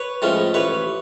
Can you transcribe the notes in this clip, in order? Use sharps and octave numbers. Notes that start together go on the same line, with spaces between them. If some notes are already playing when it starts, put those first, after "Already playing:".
Already playing: B4 C#5
A2 F3 G#3 C#4
A1 B4 C#5